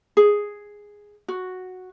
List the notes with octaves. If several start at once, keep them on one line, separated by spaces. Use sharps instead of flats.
G#4
F#4